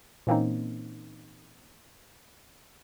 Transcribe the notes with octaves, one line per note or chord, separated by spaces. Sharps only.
A#2 E3 A#3 C4 C#4 D#4